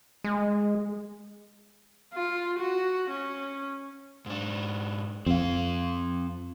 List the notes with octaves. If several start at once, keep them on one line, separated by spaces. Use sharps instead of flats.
G#3
F4
F#4
C#4
G#2 D4
F2 C4 F5